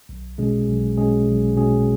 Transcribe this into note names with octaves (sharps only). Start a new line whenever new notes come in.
B1
B2 G#3 C#4 G#4
B1
B2 G#3 C#4 G#4
B1
B2 G#3 C#4 G#4